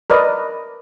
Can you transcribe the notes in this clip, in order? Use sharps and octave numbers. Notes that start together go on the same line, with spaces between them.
A#4 B4 D5 D#5